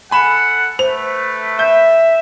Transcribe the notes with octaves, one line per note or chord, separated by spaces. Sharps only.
A4 F#5 G#5 B5 E7
A3 B4 C5 F7
E5 G6